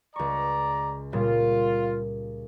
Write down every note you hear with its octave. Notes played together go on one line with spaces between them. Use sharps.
C#2 D5 A#5 C#6
A#2 C#3 G3 F4